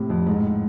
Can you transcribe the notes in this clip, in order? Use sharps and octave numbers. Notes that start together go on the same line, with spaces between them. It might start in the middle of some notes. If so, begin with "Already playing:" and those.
Already playing: A2 C3
F2
G#2
A2